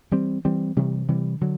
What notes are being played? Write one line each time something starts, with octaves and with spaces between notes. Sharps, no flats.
E3 G3 C4
E3 G3 C4
C3 E3 G3
C3 E3 G3
D3 F#3